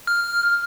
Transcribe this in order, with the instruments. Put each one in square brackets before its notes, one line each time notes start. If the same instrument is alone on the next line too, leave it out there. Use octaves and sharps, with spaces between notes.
[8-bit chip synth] F6